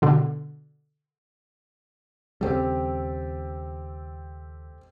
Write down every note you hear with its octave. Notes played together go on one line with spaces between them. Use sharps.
B2 D3
D#2 C#3 G3 C4 G4 A4